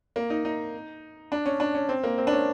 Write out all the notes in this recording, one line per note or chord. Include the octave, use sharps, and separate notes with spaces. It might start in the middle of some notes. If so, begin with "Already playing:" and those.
A#3
D#4
D#4
D4
C#4
D4
C#4
C4
A#3
C4
D4
C#4